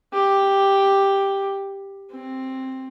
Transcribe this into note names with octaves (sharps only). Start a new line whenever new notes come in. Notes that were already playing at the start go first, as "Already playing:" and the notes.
G4
C4